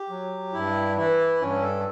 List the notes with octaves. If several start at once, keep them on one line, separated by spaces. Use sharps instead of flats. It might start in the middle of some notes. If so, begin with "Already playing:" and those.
Already playing: G4
F#3
G2 E4
E3 E4
G2 C#4
A4